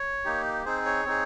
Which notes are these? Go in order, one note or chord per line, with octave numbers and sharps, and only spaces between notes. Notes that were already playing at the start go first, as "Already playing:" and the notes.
Already playing: C#5
A#3 D#4 G4
C4 D#4 G#4 C5
C#5
C4 D#4 G#4